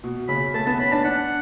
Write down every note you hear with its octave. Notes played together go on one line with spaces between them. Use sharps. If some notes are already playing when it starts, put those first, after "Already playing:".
B2
C#3 B5
A3 A5
B3 A5
C#4 B5
D4 A5
D4 F#5